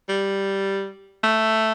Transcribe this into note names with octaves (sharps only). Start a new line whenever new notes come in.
G3
A3